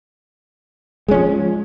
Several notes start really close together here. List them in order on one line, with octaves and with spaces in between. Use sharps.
G#3 C#4 F3